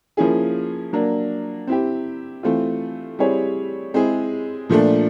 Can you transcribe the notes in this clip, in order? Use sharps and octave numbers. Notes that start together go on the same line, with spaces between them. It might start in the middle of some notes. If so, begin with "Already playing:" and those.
F3 A#3 C#4 E4 G#4
F#3 A#3 D4
C4 E4 G4
E3 A3 C4 F4
G3 C4 E4 G#4 C#5
G#3 C4 E4 G#4
A#2 F3 A3 D4